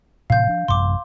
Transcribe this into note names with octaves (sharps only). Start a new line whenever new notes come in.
A2 C3 E3 F5 G6
F3 D4
A1 F#2 C3 C6 D6